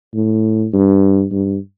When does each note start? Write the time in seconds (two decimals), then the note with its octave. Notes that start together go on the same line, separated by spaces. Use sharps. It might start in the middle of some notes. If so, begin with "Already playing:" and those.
0.14 A2
0.73 G2
1.31 G2